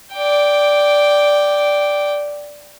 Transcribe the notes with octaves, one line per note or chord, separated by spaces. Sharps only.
D5 G5